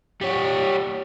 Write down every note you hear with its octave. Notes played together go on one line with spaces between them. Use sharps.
G3 C#5